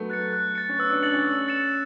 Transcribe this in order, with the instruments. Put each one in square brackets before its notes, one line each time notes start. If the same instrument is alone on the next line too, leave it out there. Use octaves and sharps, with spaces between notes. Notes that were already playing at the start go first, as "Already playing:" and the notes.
Already playing: [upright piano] F#3 A3 B3
[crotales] F#6 A6 C#7
F#6
A6 C#7
[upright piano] C#4
[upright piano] B3 [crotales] E6
[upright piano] D4
[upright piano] D4 [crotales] A6 C#7 F#7
[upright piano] C#4
[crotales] E6
A6 C#7 E7